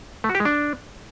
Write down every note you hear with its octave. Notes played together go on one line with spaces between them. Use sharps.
A3
F#4
G4
G#3
D4